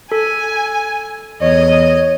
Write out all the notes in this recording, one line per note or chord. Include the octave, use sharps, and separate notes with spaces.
A4 G#5
E2 C#5 D#5